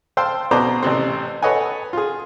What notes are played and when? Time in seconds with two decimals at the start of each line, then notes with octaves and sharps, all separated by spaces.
0.17 C5 F5 G5 A5 C6 E6
0.51 B2 B3 C5 D5 A#5
0.83 A1 C3 C4
1.42 A4 B4 C#5 D#5 F#5 G#5
1.93 F4 G#4